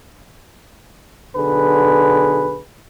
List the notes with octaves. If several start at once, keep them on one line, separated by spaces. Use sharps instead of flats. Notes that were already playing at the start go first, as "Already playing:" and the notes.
B1 D3 G#4 B4